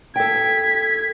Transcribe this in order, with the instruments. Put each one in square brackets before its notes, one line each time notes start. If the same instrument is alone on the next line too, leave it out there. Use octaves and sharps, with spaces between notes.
[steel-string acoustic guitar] A4 G5 [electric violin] G#6 B6